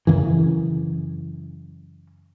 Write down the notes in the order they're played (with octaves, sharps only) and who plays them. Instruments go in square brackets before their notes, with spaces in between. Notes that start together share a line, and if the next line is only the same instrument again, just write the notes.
[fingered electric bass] F#2 C#3 E3